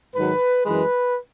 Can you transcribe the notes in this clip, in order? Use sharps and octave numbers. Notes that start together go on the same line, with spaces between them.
G#2 D#3 F#3 B4
F#2 E3 G#3 B4